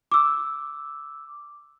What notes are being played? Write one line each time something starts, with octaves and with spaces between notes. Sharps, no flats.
D6 E6